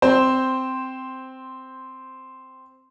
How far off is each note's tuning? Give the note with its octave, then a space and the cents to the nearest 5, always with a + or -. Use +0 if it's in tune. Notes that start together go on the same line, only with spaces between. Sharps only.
C4 -5 C5 +0